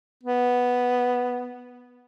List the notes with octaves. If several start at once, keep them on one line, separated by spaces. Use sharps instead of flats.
B3